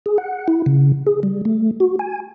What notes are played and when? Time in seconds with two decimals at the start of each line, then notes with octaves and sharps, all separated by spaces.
0.06 G#4
0.18 F#5
0.48 E4
0.66 C#3
1.07 G#4
1.23 G3
1.45 A3
1.80 F#4
1.99 G#5